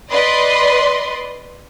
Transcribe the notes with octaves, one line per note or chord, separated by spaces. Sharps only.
B4 D5 D#5 C6